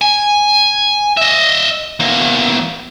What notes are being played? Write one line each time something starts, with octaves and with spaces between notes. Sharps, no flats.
G#5
D#5 E5
E2 A#3